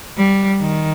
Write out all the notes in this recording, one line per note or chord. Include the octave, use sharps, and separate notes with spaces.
G3
D#3